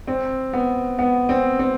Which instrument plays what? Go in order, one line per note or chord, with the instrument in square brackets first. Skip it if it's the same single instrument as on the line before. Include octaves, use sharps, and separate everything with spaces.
[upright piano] C4
B3
B3
C4
C4